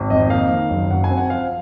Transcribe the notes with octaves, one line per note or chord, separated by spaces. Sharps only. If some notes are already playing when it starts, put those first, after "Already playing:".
Already playing: G#1
F2 D#5
A#3 F5
D#3
F#1
F#2 F#5
G#5
C4
F#5
F3 F5